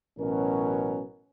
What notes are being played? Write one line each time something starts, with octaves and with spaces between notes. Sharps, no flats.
A1 B2 F#3 C#4 A#4